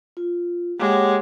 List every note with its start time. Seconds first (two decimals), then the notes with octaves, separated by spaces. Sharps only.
0.17 F4
0.79 G#3 A#3 G4 C#5 F#5